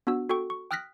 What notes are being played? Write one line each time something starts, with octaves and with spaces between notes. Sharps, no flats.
B3 D4 F#4 E6
F#4 A4 G5 C#6
C#6
G5 D#6 F6 F#6 A#6 B6